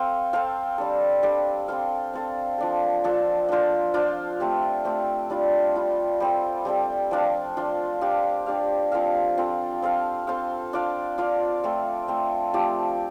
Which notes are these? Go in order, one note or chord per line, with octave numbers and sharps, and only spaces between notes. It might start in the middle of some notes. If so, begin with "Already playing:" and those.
Already playing: C4 A4 C5 F5
C4 A4 C5 F5
G3 D4 A4
G3 D4 A4
C4 A4 C5 F5
C4 A4 C5 F5
F3 D4 A4
F3 D4 A4
D4 F4 C5
D4 F4 C5
A3 C4 G4
A3 C4 G4
G3 D4 F4
G3 D4 F4
G3 C4 A4
G3 C4 A4
F3 D4 F4
F3 D4 F4
D4 G4 F5
D4 G4 F5
F3 C4 A4 F5
F3 C4 A4 F5
C4 A4 C5 F5
C4 A4 C5 F5
D4 F4 D5 F5
D4 F4 D5 F5
A3 C4 A4
A3 C4 A4
F3 A3 C4 G4